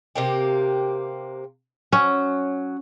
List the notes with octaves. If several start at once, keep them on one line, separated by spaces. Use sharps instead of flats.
C3 A#3 G4
F#3 C#4